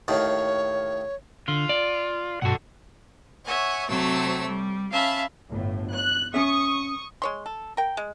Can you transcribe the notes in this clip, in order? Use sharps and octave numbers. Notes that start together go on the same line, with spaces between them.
D#2 A2 D#3 C#5
D3 F4
D5
B1 G2 F#4 A4 F#5
C#5 E5 F#5 G#5
C3 F#3 A3 C4 C#5 E6
G3
C#4 E5 F5 A5 B5
G1 A2
F#6
C#4 E5 C#6 D#6
G#3 C#5 C6
A4
A#4 G5
G#3